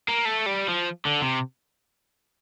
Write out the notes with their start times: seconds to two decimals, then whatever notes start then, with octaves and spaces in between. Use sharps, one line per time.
0.08 A#3
0.25 A3
0.46 G3
0.68 F3
1.05 D3
1.21 C3